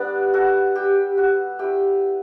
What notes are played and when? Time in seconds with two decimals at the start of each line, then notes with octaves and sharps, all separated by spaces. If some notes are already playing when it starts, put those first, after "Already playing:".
Already playing: G3 B3 D4 B4 D5
0.34 F#4 A4
0.75 G4
1.18 F#4
1.59 A3 E4 G4